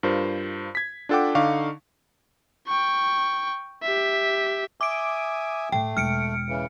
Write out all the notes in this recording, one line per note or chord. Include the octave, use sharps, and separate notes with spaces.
G2 F4 A#4 C5
G#6 B6
D4 F4 A4 F#5 G5 D6
D3 D#4 F5 C#6 D6
G5 C#6
G4 E5
E5 G#5 D6 D#6 D7
A2 A3 G5
E1 F6 C#7 D7
C#3 E3